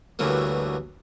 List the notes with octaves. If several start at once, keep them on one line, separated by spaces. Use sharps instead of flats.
D2 G2 D3 E3 F#3 A#3